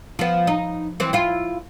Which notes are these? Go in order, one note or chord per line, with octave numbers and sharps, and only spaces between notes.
F3 B3
D#4
E3 C4
E4 F4